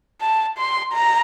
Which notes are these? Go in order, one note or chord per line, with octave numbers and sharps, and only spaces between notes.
A5
C6
A#5